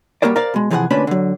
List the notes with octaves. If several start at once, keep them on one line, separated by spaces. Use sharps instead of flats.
G3 A#3 F#4 A#4 C5 D5
A#4 C5 D5 F5
B2 G#3
C3 E3 F3 G#4 D5 F#5
D2 A#2 C#4 D4 B4 B5
D3 F#3